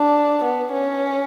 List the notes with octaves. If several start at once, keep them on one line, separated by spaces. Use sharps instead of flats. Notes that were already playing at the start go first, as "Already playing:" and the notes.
Already playing: D4
B3
C#4